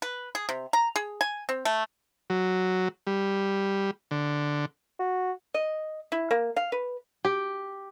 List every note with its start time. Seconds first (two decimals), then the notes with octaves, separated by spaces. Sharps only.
0.02 B4
0.35 G#4
0.49 C3
0.73 A#5
0.96 G#4
1.21 G#5
1.49 C4
1.65 A3
2.30 F#3
3.07 G3
4.11 D3
4.99 F#4
5.54 D#5
6.12 E4
6.31 A#3
6.56 F5
6.72 B4
7.25 G4